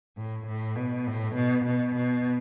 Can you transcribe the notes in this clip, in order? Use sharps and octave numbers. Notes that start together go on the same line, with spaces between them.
A2
A2
B2
A2
B2
B2
B2